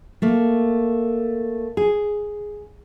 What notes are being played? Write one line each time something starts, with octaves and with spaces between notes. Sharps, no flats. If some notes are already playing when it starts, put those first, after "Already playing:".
A3 A#3
G#4